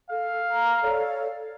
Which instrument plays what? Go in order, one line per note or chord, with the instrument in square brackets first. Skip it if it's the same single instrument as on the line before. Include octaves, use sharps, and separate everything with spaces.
[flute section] A4 [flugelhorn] F5
[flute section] A#5
A4 C#5 D5